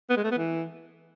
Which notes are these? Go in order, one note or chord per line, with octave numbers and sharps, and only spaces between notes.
B3
G#3
A3
B3
E3